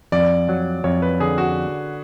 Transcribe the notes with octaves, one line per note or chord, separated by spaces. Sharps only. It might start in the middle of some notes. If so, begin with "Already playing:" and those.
F2 D5
F#3
F2 C#5
B4
D3 G#4
F#4